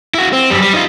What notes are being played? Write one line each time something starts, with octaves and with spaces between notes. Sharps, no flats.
E4 F#4
C4
F#2 G3
G3
D#4 F4